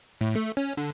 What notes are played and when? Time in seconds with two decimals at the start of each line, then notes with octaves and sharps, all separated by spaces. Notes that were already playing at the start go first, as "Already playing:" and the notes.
0.21 A2
0.36 A3
0.57 C#4
0.77 D3